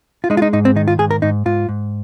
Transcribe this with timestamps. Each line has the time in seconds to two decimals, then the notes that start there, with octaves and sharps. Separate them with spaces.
0.24 F4
0.30 G#3 D#4
0.37 F4
0.42 D#4
0.53 G#2 D#4
0.65 C4
0.76 D#3 D#4
0.88 F4
0.99 G#2 G#4
1.11 A#4
1.22 G#2 D#4
1.46 G#2 F4
1.69 G#2